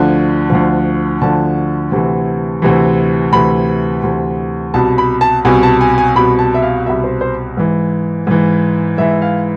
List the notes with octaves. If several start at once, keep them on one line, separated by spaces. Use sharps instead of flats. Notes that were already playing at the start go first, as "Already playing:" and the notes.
Already playing: D2 D3 F3
D2 D3 F3
D2 D3 F3 A5
D2 C3 E3
D2 C3 E3
D2 C3 E3 B5
D2 C3 E3
C2 B2 A5
B5
A5
C2 B2 G#5
A5
G#5
G#5
C2 B2 B5
A5
E5
F5
C2 B2 E5
C5
C5
G#2 E3
G#2 E3
G#2 E3 E5
F5